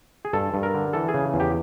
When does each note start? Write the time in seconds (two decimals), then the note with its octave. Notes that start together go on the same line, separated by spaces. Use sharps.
0.25 G#4
0.33 G2 A4
0.54 G2
0.63 A#4
0.74 D3
0.93 E3 A4
1.09 G#4
1.14 C#3
1.34 E2
1.40 G4